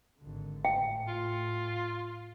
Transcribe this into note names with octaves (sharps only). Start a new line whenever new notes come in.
G#1 D3
A2 G5
F4